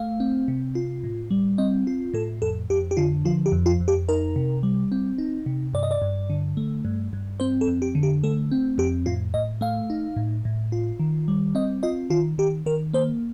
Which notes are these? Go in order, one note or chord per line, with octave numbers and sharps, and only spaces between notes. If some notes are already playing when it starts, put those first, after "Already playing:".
Already playing: A3 F5
C4
C3
F4
A2
G3
C4 D#5
F4
A2 A4
F2 A4
F2 G4
G4
D3 F4
F3 F4
G4
F2
F4
F2
G4
D#4 A#4
C3
G3
C4
D#4
C3
G2 D5
D#5
D5
G2
D3
A3
G2
G2
C4 C5
A4
F2
G4
D3
G4
A3 A4
C4
F2 G4
A2 F4
A2 D#5
A3 F5
D#4
A2
A2
F4
D#3
G3
C4 D#5
F4 D#5
D#3 F4
D#3 G4
D#3 A#4
A#3 C5